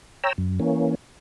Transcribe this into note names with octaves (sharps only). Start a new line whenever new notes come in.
C#5 G5 A#5 E6
F#2
E3 A#3 C#4